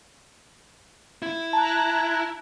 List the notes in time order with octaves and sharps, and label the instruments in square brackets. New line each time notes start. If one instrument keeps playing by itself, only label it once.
[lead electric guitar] E4
[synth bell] A5 [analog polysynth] A#5 F#6